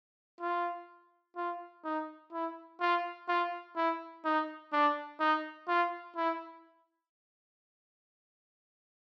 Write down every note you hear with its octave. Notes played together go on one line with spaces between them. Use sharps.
F4
F4
D#4
E4
F4
F4
E4
D#4
D4
D#4
F4
E4